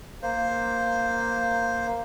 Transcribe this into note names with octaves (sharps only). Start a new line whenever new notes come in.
A#3 C5